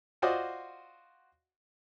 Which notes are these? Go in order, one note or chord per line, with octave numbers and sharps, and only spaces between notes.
F4 F#4 C5 D5 D#5